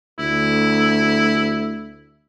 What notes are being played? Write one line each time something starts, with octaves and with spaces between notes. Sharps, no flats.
D2 E4